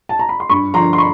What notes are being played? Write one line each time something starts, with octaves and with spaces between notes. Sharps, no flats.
A5
A#5
B5
C6
G2 B5 C#6
D3 F3 A#5 C6
C6
B5 C#6